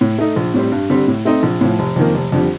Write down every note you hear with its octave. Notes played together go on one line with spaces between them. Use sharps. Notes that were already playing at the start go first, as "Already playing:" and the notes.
A2
A3 D#4
A#1
A2 G3 C4
G2
D3 G3 C4
A2
A3 C4 D#4
A#1
A2 F3
F1
F2 D#3 A#3
F1
F2 D3 G3